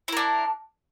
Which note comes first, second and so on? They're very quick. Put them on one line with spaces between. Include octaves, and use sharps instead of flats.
E4 A#4 D4